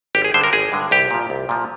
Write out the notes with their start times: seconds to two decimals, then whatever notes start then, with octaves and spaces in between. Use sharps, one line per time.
0.15 G#1 G4
0.25 G#4
0.34 G2 D3 G#3 C5
0.44 A#4
0.53 G#1 G#4
0.72 G2 D3 G#3
0.91 C2 G4
1.11 A#2 F3
1.30 C2
1.49 A#2 F3